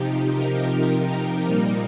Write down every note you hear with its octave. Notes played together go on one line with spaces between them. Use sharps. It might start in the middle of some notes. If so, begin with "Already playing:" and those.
Already playing: C3 F3 D#4 G4
A#4
A#2 G3 A#3 D#4